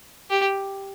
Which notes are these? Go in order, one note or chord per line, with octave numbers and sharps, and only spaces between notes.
G4